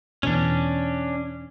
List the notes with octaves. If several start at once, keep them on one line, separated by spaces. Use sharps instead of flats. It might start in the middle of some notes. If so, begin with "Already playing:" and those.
E2 B2 C#4 D4